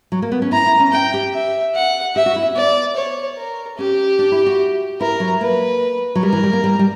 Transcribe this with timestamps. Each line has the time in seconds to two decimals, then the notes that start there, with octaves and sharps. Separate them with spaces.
0.12 F#3
0.22 A#3
0.32 B3
0.42 C#4
0.52 E4 A#5
0.66 E4
0.80 C#4
0.92 C#4 G5
1.14 G4
1.34 E5
1.75 F#5
2.15 G4 E5
2.26 F#4
2.36 E4
2.46 C#4
2.55 B3 D5
2.96 C#5
3.38 A#4
3.77 C#4 G4
4.19 D4
4.32 E4
4.46 F#4
5.01 E4 A#4
5.20 F#3
5.41 A#3 B4
6.15 F#3
6.22 G3 A#4
6.33 E3
6.43 G3
6.53 A#3
6.64 G3
6.79 G3